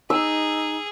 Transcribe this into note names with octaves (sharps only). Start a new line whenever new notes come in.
D#4 G#4 E6